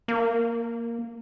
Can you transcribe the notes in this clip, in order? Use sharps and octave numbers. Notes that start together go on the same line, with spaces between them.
A#3